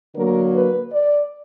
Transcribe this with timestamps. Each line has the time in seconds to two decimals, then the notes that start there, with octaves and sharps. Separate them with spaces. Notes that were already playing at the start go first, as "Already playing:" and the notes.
0.15 D3 F#3 A#3 A#4
0.53 B4
0.92 D5